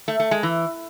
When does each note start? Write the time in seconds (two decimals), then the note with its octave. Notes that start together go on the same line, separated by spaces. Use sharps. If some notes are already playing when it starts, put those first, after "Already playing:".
0.08 A3
0.20 A3
0.31 G#3
0.43 E3